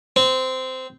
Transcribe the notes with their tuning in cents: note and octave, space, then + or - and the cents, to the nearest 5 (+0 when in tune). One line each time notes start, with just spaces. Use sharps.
C4 -15